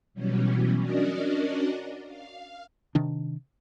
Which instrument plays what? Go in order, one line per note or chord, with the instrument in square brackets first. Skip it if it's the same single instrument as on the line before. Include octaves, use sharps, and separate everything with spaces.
[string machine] B2 E3 F#3 G3 C#4
C#4 D4 F#4 A#4 D5 D#5
F5
[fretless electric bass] C3 D#3 D4